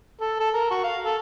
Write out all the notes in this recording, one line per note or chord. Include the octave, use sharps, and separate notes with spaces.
A4
A4
A#4
F#4
F5
A4